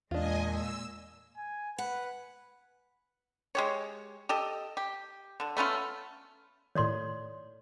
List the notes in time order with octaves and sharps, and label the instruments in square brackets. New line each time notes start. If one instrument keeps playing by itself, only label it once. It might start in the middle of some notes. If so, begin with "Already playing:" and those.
[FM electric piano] E2 [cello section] A#2 G#3 [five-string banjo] D4 F4 [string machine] D#5 G#5
[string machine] E6
[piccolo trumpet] G#5
[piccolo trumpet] B4 [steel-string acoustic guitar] F#5
[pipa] G#3 G4 C#5
G4 A4 D#5
G4
D3 D4
A3 B3 C#4 F4
[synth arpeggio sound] A2 D#3 [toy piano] C#5 D5 C6